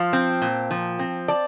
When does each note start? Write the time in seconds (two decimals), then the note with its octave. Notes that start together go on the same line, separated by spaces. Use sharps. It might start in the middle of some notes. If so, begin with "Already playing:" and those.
Already playing: F3 F5 A5 C6
0.13 C4 G5
0.42 A#2
0.71 F3
0.99 C4
1.28 D5 A5